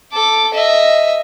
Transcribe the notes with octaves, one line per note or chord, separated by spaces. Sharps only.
A4 D6
D#5 E5